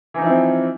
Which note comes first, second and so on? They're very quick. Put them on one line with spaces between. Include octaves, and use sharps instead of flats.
E3 D#4 F3 E4 C4